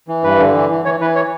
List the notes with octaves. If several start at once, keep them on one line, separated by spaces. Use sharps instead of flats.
E3
G2 B4
D3
E3
E3
E3 C#5
E3 B4
C#5